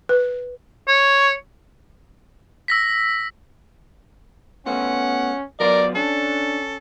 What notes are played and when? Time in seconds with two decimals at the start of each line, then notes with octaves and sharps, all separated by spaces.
0.09 B4
0.88 C#5
2.68 E6 A#6 B6
4.66 A3 B3 C#4 F4 F#5
5.60 F#3 B3 F4 A#4 D5
5.95 C#4 D4 A4